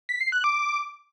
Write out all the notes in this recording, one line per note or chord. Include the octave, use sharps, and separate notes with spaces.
B6
C7
F#6
D6